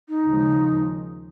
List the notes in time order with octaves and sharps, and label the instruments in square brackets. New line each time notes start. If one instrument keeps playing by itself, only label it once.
[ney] D#4
[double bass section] D#2 C#3 F3 G#3